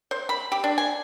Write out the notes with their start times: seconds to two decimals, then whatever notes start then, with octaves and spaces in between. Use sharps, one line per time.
0.11 C5
0.29 B5
0.52 G4
0.64 D4
0.78 G#5